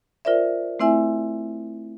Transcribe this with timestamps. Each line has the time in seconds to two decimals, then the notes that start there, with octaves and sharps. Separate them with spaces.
0.25 F4 A#4 C5 D5 E5
0.80 A3 C4 E4 E5 G#5